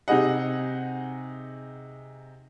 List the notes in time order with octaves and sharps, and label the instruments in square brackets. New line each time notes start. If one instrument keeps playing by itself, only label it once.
[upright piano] C3 D#4 G#4 D#5 F#5